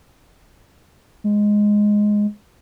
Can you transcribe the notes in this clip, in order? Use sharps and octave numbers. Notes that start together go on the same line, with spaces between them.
G#3